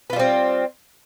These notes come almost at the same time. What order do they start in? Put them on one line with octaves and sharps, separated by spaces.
B3 F4 G3 C4